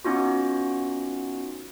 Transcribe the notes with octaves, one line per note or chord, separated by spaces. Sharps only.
B3 C#4 D#4 F4 F#4